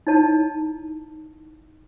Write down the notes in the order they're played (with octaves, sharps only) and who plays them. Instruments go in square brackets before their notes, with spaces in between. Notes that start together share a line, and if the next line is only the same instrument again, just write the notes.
[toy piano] D#4 E4 C#5 A5